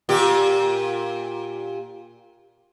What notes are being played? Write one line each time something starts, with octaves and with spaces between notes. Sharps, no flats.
A#2 G4